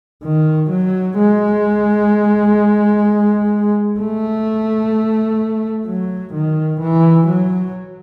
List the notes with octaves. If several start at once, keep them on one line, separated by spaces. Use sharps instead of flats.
D#3
F#3
G#3
A3
F#3
D#3
E3
F#3